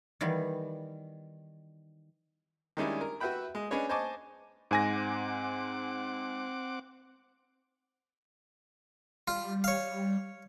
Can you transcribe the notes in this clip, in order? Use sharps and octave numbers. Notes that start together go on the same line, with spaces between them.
D#3 E3 G3 B3
D#3 G3 G#3 C#4 D4 E4
A#4
F#4 B4 E5 F#5 G5 B5
G#3
C#4 D4 G#4 B4 C#5 D#5
C5 D#5 G#5 A5 C#6 D6
G#2 C4 F#5 G#5 D6 A#6
G3 F4
C#5 F5